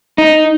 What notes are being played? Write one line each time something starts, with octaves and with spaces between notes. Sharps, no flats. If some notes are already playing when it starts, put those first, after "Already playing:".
D#4